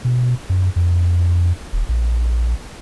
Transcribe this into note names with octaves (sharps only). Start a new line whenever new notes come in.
B2
F#2
F2
D#1
A#1